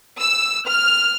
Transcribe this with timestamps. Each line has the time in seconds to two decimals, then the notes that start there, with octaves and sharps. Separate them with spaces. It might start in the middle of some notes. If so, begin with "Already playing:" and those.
0.20 E6
0.67 F6